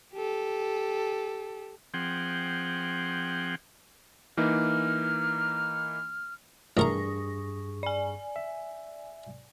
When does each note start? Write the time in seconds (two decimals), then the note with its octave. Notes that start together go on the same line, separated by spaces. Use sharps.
0.14 G4 A4
1.94 F3 C4 G#4 F#5 G5
4.37 E3 A#3 D#4 F6
6.77 A1 G2 G#4 A#4 A#5 C#6 D#6 A#6
7.83 D5 G#5
8.36 E5